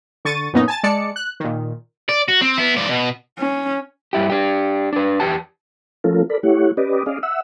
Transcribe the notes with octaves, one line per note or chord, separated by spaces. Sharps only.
D3 C#6 A6 D#7
F#2 A#2 B3 C#4 D#4
G#5 A5 A6
G#3 D5 A5 C#7
F#6
A#2 D#3
D5
F#4
C4
B3 E4
G#2 D5
B2
C#4
G2 E4 G4
D4 G4
D4 B4
E2 G4 A5
F3 A3 C#4 F4 A4 A#4
A4 A#4 D5 B5
A3 E4 G4 C#5 F#5
C#4 G4 B4 D5 D#5
C#4 G#4 D5 D#5 F5
E5 F#5 E6